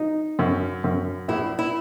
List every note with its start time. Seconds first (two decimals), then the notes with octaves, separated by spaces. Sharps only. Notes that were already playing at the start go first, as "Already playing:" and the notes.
Already playing: D#4
0.39 F#2
0.84 F#2
1.28 A#1 E4
1.59 E4